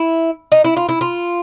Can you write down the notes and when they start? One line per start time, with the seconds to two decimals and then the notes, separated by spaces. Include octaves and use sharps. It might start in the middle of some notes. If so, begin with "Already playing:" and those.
Already playing: E4
0.52 D#4
0.64 E4
0.76 F4
0.89 E4
1.01 F4